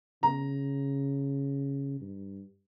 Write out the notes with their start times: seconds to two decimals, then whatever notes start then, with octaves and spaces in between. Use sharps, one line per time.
0.23 C#3 A#5
2.01 G2